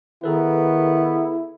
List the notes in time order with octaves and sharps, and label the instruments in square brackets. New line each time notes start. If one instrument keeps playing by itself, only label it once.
[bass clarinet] D#3 [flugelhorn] B3 [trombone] E4 [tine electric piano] G#4 A4 B4